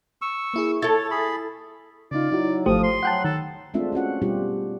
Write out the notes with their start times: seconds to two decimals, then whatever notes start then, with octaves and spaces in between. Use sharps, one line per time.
0.22 C#6 E6
0.54 A#3 E4 G#4
0.82 E4 A4 C#5 A6
1.11 G#4 B5
2.11 C#3 D#4 F4 D5
2.31 F#3 D#4 E4 F#4
2.66 G#1 F3 A3 G4 C5 D#6
2.84 C6
3.03 F#3 F#5 G5 A5 B5 F#6
3.24 D#3 A4
3.74 G#3 A3 C4 D4 F4 E5
3.92 C#4 F4 F#4 F#5
4.22 B2 G3 D4 F4 G4